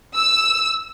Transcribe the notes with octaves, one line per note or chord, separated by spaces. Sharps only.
E6